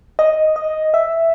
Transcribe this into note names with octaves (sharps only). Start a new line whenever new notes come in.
D#5
D#5
E5